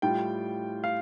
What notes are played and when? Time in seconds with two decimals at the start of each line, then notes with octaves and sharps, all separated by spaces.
0.02 A2 G3 F4 G5
0.84 F5